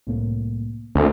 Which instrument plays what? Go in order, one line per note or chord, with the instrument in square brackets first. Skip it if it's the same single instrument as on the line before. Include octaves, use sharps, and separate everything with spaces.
[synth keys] C2 A2 A#3
[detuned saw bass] D2 [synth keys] C4 A4 A#4